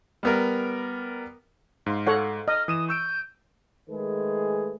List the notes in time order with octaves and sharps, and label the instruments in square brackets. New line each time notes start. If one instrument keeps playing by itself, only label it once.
[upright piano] G3 B3 A#4
[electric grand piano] G#2 F5 C6
[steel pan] A4 C#5 F#5
[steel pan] D#5 [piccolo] F6
[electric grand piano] E3 D#7 E7 [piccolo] D#6
[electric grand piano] C#6 E6 D7 [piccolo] G6
[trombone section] D#3 G#3 A3 G#4 B4